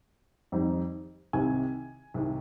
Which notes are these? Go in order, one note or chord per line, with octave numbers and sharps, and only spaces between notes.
F2 D#3 G3 C4 D#4
C2 C3 D#3 G#5
C2 C3 D#3